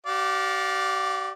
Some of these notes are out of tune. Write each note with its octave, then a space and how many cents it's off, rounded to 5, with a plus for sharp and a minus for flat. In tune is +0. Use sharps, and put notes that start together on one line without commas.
G4 -45 D5 +0 F5 +20